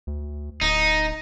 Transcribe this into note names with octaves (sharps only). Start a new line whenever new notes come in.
D2
D1 D#4